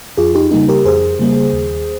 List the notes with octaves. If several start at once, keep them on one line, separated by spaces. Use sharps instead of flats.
F2 F4 G#4
D#4 G4
C#3 G3 A#3 D#4
G4 A#4
F2 G#4 C5
C#3 G3 A#3
D#2